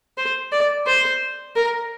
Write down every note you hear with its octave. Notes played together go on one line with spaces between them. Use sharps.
C5
D5
C5
A#4